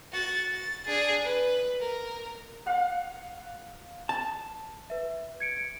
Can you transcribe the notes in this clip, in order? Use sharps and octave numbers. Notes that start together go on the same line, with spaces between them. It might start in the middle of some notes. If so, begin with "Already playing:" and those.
F#4 A6
A6
D4 G#4
B4
A#4
F5 F#5
A5
B4 E5
G#6 C#7 D7